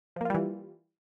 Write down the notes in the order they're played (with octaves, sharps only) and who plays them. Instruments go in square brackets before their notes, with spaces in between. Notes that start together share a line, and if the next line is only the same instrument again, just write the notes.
[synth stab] F3
A#3
F4
G3
E3